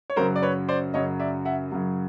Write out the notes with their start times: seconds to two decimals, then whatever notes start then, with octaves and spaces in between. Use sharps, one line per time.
0.10 C#5
0.16 F#2 C#3 F#3 A#4 C5
0.36 D5
0.42 B4 C#5
0.69 C5 D5
0.94 F#2 C#3 F#3 C#5 D#5
1.20 D5 E5
1.45 E5 F#5
1.72 F#2 C#3 F#3